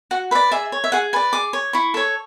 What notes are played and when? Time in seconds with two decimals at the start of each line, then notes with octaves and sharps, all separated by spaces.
0.11 F#4 F#5
0.31 B4 E5
0.35 D5
0.52 G#4 E5
0.72 C#5
0.84 E5
0.92 G#4 F#5
1.13 B4 D5 G#5
1.33 G#4 D6
1.53 C#5
1.73 E4 C#6
1.94 A4 C#5